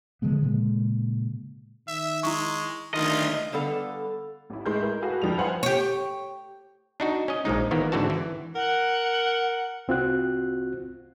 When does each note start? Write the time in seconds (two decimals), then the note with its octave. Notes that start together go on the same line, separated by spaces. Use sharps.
0.22 D3 F3 G#3 B3
0.42 A#2 C#3 G#3 A#3
1.88 D#3 E5
2.23 G#3 E4 C#6
2.94 D2 D#3 F4 D#5
3.52 D3 G3 B3 A4 F5
4.50 A1 E4
4.66 A2 G#3 E4 C6 G6
4.82 A#4
5.02 F#4 G#4 A4 B4 F5
5.22 F1 F3 G3 F7
5.38 B4 C5 F5 F#5 G#5 C6
5.63 G4 C#5
7.00 D4 D#4 F#4
7.28 C#4 D#5
7.45 A#1 F3 G#3 D#4
7.71 D#3 E3 A#3 B3
7.92 G#2 D3 E3 C4 F#4 A5
8.10 E3
8.55 A#4 F#5
9.88 C2 C4 F4 F#4 F#6